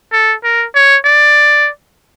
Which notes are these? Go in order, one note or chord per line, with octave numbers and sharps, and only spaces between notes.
A4
A#4
C#5
D5